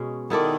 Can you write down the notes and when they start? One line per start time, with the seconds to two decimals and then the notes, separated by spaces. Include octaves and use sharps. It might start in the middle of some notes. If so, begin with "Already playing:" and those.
Already playing: B2 G#3 C#4
0.30 D#3 B3 E4 A4 D5